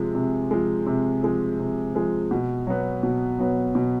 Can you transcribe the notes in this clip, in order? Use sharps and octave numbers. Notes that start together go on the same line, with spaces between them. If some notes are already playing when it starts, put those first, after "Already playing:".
Already playing: C3 F3 G#3
C3
F3 G#3
C3
F3 G#3
C3
F3 G#3
B2
F#3 B3
B2
F#3 B3
B2